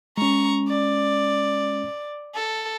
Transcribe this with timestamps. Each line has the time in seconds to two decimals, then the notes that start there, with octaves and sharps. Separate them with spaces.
0.18 G#3 C#4 A#5 C#6
0.68 D5
2.35 A4